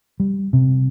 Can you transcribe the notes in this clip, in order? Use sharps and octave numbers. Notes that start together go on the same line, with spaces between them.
G3
C3